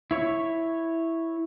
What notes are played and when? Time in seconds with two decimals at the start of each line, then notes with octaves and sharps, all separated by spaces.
0.11 E4 C#5